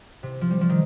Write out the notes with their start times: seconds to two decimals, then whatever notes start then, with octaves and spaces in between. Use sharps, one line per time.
0.23 C3
0.41 F3
0.51 G3
0.61 F3
0.69 D#3